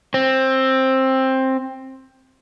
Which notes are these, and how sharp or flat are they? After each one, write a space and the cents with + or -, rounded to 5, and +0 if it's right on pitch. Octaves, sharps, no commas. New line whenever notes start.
C4 +15